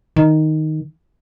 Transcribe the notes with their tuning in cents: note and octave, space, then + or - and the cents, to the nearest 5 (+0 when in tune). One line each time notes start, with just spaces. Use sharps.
D#3 +0